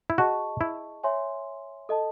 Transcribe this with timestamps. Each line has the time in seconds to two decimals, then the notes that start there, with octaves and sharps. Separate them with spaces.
0.10 E4
0.18 F#4 G#4 D#5 A5 C#6
0.61 E4
1.04 C#5 E5 G#5 C6
1.89 A4 D#5 A5